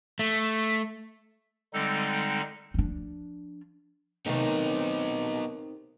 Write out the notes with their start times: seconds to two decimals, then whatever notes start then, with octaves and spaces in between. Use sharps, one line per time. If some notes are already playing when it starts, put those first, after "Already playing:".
0.19 A3
1.73 D3 G3 G#3 C4 D#4 A4
2.74 F3 D4
4.26 C3 D#3 A3 B3 D#4